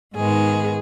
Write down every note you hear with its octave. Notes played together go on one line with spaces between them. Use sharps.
G#2 D#3 G#3 B3 G#4